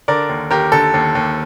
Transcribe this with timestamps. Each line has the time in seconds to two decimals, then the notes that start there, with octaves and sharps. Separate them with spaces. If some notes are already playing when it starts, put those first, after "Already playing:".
0.08 D3 A#4 D5
0.29 D#2
0.51 D#2 G4 A#4
0.72 D3 A4
0.94 D#2
1.15 D#2